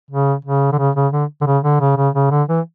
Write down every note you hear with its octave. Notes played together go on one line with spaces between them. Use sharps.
C#3
C#3
D3
C#3
C#3
D3
D3
C#3
D3
C#3
C#3
C#3
D3
E3